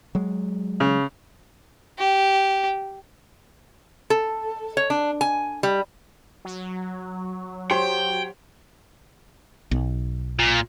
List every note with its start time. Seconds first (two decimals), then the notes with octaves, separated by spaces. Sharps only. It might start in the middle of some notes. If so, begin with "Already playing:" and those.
0.15 F#3 G#3
0.80 C#3
1.99 G4
4.10 A4
4.77 C#5
4.90 D4
5.21 G#5
5.63 G3
6.45 F#3
7.71 F#4 G4 C5 C#5 G5
9.71 B1
10.39 A#2